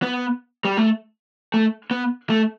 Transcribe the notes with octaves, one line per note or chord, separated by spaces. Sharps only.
B3
G3
A3
A3
B3
A3